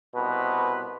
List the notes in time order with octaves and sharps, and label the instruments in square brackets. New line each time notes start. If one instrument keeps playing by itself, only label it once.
[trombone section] C2 B2 C4 B4